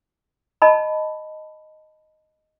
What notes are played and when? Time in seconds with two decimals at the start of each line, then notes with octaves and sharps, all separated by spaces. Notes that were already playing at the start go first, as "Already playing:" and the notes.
0.62 D#5 A5 B5